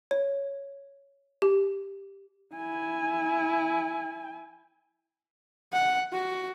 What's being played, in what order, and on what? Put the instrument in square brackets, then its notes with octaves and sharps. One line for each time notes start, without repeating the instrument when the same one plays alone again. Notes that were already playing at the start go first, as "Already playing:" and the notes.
[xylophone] C#5
G4
[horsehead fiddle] E4 G#5
F#5
F#4